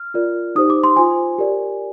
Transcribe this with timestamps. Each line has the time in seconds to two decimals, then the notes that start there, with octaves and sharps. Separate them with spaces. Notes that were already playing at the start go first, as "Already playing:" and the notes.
Already playing: F6
0.14 F4 A#4 D5
0.55 D#4 G4 C5 D#6
0.70 D6
0.84 C6
0.96 F4 C5 G#5
1.38 G4 A#4 D5